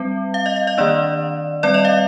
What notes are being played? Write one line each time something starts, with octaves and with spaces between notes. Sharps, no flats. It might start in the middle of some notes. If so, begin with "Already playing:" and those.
Already playing: G3 C4
F5
D#5
F5
D#5
D#3 A#3 D4 D5
G3 C4 D5
D#5
F5